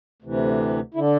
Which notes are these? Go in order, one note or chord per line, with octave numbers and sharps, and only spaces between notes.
D2 C3 E3
D3 E4